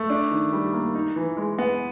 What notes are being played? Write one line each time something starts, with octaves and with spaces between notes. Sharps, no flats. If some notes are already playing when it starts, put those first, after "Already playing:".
Already playing: A3
D4
D#3
G3
A#3
D#4
E3
G#3
B3